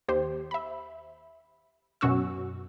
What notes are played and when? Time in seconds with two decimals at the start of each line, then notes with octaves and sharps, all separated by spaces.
0.08 D#2 G4 C5
0.51 E5 B5
2.01 F#2 B2 C#4 F#4 C#6 E6